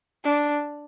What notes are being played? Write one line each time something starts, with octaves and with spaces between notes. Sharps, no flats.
D4